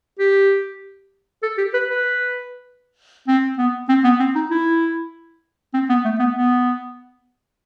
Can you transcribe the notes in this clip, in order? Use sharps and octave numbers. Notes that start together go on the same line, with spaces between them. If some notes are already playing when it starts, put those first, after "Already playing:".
G4
A4
G4
B4
B4
C4
B3
C4
B3
C4
D#4
E4
C4
B3
A3
B3
B3